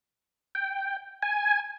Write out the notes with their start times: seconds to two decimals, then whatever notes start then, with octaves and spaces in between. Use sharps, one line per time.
0.55 G5
1.22 G#5